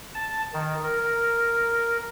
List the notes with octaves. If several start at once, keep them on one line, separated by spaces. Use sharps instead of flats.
A5
D#3
A#4